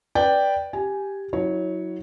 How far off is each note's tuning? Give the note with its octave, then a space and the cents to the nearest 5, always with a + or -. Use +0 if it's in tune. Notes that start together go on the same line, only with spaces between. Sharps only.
B4 +0 D5 +0 G5 +0
G4 +0 G#5 +0
F#3 -10 E4 -40 C#5 +0